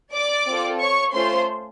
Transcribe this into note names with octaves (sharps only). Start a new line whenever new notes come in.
D5 D6
C4 F4 A4
C#5 C#6
A3 C#4 F4 C5 C6